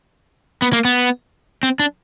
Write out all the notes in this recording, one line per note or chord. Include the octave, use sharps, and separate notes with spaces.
B3
A#3
B3
C4
D4